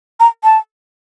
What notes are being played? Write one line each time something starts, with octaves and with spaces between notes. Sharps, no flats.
A#5
A5